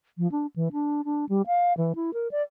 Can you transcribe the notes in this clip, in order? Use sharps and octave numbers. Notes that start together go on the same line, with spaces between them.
F3
D4
E3
D4
D4
G3
F5
E3
E4
A#4
D5